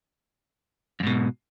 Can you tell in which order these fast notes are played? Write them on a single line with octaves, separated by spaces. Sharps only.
F2 G#2 B2